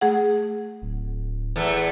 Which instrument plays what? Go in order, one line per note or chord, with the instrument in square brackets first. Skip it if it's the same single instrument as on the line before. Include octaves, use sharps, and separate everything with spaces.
[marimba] A3 G#4 F#5
[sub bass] D1
[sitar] E2 A3